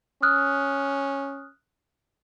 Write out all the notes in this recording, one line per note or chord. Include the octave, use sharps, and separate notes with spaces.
C#4 D#6 F6 F#6